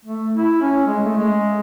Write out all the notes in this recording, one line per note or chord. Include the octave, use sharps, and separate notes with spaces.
A3
E4
C#4
G#3
A3
G#3